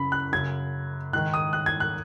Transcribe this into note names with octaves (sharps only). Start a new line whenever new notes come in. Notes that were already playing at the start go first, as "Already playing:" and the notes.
Already playing: F#2 C#3 B5
F#6
F#2 C#3 G#6
G#2 D#3 F#6
D#6
F#6
G#6
F#6